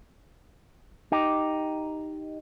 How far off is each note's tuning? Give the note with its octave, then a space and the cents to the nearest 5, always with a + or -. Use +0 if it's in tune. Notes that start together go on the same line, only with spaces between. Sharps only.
D#4 +0 G4 +0